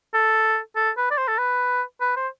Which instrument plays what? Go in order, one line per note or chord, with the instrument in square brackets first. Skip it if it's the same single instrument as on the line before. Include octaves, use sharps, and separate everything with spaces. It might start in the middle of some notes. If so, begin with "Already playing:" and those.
[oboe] A4
A4
B4
D5
C5
A4
B4
B4
C5